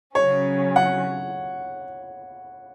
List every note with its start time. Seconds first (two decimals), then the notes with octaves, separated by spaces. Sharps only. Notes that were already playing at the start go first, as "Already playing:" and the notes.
0.15 C#3 F#3 C#4 C#5
0.76 F#5